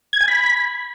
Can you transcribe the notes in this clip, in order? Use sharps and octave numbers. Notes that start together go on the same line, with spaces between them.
G#6
G#5
B5